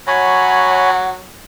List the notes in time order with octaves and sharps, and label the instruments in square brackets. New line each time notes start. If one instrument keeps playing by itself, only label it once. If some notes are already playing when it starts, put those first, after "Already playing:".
[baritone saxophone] F#3 [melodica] C#5 G#5 B5 [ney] F#5